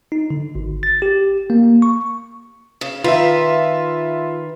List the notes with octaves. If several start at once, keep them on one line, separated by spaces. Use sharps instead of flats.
D#4
D3
G#1
A6
G4
A#3
C#6
C#3
D#3 F4 B4 E5